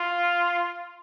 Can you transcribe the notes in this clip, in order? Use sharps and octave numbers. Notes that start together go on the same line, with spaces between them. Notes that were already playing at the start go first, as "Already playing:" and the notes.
Already playing: F4